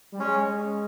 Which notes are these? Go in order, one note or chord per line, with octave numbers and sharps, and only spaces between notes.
G3
G#3 C#4